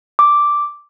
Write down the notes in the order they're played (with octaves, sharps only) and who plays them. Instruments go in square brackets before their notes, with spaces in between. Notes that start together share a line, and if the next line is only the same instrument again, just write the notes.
[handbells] D6